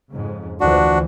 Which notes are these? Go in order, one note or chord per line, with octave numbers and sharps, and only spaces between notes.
F2 G#2 C#3
D2 E3 F3 D4 F#4